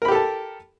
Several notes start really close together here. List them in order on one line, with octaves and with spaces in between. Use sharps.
A#4 B5 G4 A4 A5